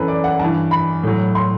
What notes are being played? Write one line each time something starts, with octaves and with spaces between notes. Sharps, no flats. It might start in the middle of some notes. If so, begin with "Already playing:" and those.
Already playing: F#2 E3 A4 B4
D5
F#5
G2 E3 A5
B5
A2 F#3
C6